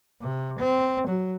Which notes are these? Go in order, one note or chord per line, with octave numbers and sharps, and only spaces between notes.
C3
C4
F#3